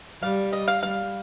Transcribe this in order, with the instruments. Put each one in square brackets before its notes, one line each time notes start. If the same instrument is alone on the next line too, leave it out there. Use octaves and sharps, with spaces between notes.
[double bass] G3 [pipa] F5
[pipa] D#5
F5
[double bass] G3 [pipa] F5